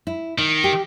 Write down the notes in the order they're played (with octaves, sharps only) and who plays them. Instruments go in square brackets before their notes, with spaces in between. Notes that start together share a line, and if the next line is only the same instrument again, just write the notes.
[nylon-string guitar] E4
[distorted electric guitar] D#3 [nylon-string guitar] D#4
[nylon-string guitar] G4